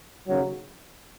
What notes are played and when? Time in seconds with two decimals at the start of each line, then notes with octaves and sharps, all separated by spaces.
0.27 D#2 C#3 F#3